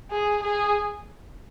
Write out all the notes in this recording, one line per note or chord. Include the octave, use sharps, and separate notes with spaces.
G#4
G#4